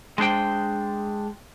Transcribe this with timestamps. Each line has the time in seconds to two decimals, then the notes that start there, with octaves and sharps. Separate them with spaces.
0.18 G#3 D4 C5 G5